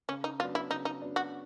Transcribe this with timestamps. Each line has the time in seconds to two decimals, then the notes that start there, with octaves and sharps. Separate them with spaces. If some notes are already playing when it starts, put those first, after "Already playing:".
0.09 C#3 C#4
0.24 D#4
0.40 F#3 B3 D4 F4
0.55 E4
0.70 C#3 D#4
0.85 D#4
1.01 F#3 B3 D4
1.16 F#4